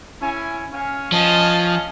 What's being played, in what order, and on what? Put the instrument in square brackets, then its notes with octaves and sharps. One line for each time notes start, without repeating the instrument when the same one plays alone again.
[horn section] C#4 E4 G#5
C#4 F5 G#5
[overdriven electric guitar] F3 [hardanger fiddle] D#5 A5